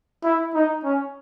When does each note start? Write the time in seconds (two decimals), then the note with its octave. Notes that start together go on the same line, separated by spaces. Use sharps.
0.24 E4
0.54 D#4
0.84 C#4